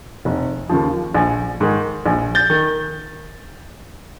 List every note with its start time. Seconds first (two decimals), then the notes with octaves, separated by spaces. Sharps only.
0.25 F1
0.69 D#2 C#3 F3
1.15 A#1
1.61 G#2 D#3
2.06 A#1
2.35 G6 A6
2.50 D#3